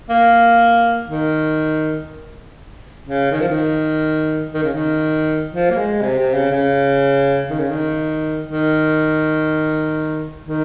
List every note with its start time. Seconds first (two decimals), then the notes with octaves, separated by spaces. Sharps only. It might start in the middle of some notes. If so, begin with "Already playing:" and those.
0.09 A#3
1.09 D#3
3.06 C#3
3.31 D#3
3.40 F3
3.48 D#3
4.54 D#3
4.63 C#3
4.73 D#3
5.53 F3
5.71 A#3
5.77 G#3
6.01 C3
6.18 C3
6.34 C#3
6.51 C#3
7.50 D#3
7.59 C#3
7.70 D#3
8.48 D#3
10.45 D#3